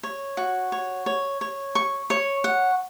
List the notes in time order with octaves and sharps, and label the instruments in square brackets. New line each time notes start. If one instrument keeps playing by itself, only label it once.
[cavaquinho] C#5
F#4
C#5
C#5
C#5
C#6
C#5
F#5